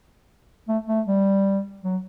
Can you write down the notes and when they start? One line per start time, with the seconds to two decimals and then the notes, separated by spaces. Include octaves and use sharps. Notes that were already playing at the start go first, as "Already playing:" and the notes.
0.68 A3
0.87 A3
1.07 G3
1.83 F#3